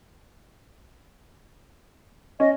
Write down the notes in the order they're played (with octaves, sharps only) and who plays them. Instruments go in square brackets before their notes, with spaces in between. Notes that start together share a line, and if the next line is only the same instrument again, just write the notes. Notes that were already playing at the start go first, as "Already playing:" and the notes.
[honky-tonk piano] C#4 [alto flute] D#5